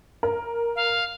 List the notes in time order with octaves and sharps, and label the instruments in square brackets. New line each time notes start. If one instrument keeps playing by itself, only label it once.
[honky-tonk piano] A#4
[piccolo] F5